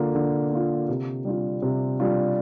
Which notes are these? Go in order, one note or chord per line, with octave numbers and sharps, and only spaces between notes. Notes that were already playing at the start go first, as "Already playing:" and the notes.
Already playing: D3 A#3 F4
D3
A#3 F4
C3
G3 D4 F4
C3
G3 D4 F4